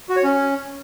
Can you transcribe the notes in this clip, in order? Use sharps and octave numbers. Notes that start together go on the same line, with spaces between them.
F#4
C#5
C#4